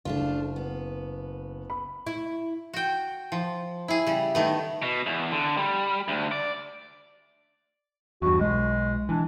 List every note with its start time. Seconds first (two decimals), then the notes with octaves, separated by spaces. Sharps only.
0.05 F#1 A3 D4 F4
0.56 B3
1.70 B5
2.07 E4
2.74 F#4 G5
3.32 F3
3.88 E4 G#4
4.07 C#3 G3
4.35 D#3 A3 B3
4.82 B2
5.06 E2
5.32 D3
5.57 G3
6.08 D2
6.31 D5
8.22 E2 G2 F#4
8.40 B1 G#3
9.09 E3 D4